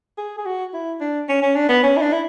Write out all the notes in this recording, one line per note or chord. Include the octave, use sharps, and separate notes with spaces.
G#4
G#4
F#4
E4
D4
C#4
C#4
D4
B3
C#4
E4
D4
E4